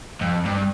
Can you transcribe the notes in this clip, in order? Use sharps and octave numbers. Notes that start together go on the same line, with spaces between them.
F2
G2